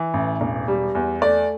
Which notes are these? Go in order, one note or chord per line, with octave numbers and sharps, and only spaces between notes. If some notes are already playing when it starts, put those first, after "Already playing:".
Already playing: E3
A1
E1
G3
E2
A3 D5